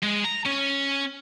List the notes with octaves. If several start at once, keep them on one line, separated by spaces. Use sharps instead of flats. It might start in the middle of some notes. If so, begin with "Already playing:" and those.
G#3
A#5
C#4